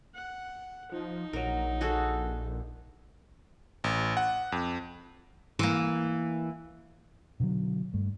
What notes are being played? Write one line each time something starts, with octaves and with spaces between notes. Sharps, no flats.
F#5
F3 D#4
A#1 F#3 A#4
F#4 G#4 A4
A1
F#5
F2
E3 A#3
B2 D3 E3 F#3
G2 A3